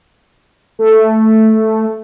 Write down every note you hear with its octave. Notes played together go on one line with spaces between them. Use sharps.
A3